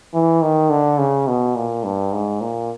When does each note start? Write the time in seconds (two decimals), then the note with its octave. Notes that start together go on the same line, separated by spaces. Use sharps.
0.14 E3
0.42 D#3
0.70 D3
0.99 C#3
1.28 B2
1.56 A#2
1.84 G2
2.13 G#2
2.41 A#2